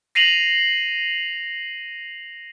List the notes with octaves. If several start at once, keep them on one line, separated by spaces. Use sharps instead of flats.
A#6 C7 D#7 F7 F#7